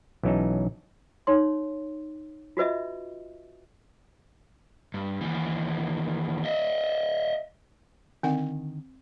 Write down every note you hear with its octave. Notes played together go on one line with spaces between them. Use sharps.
B1 E3 F#3 C#4 D#4 A5
D#4 C#5 C6
F4 F#4 B4 D#5 E5
G2
D#2 E3
D#5 E5
D3 D#3 C4 F#5